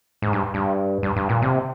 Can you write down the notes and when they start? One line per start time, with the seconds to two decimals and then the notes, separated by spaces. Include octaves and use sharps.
0.22 G#2
0.33 G2
0.54 G2
1.03 G2
1.16 G2
1.29 A#2
1.42 C3